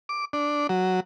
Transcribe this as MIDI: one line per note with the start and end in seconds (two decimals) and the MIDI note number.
0.09 0.25 86
0.33 0.67 62
0.69 1.00 54